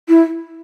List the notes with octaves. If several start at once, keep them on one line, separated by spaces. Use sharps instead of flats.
E4